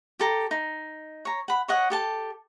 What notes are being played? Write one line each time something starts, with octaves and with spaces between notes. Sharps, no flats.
G4 A4 A#5
D#4
C#5 A#5
F#5 B5
C#5 D#5 F#5
G4 A4 A5